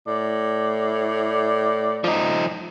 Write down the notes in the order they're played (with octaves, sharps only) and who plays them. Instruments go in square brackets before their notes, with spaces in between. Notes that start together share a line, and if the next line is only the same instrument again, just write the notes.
[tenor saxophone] A2 [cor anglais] D5
[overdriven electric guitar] F3 D#4